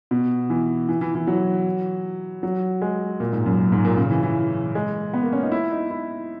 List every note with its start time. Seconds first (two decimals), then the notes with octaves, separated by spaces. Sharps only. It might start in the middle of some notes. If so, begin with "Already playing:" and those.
0.11 B2
0.50 E3
0.89 E3
1.01 E3
1.15 E3
1.27 F#3
2.43 F#3
2.82 G#3
3.20 A#2
3.33 G#2
3.46 F#2
3.72 G#2
3.85 A#2
3.97 C#3
4.11 E3
4.23 E3
4.75 G#3
5.14 B3
5.23 A#3
5.32 C#4
5.43 D#4
5.52 E4
5.72 D#4
5.91 E4